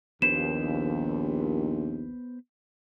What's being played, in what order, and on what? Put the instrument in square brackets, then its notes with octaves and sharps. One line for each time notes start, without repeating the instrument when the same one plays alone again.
[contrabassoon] A#1 [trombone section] D#2 [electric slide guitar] B3 B4 C5 [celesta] E7